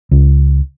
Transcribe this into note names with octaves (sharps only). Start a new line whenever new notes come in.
C#2